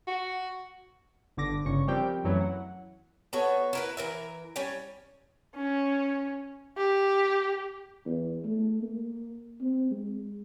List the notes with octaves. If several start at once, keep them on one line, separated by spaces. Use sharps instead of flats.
F#4
G1 D3 D6 A#6
G1 C#3 C#6
F3 G3 C4 G4 A#4 G5
F#2 E3 F#3 A3 E4
F#5
B3 F#4 A4 C#5
E4 A#4 B4
E3 A#4 E5
G3 C#4 C#5
C#4
G4
E2
A3
A#3
C4
G#3